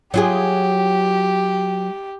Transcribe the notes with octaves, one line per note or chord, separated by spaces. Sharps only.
F#3 F4 G4 G#4